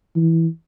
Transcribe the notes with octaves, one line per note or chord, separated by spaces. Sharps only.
E3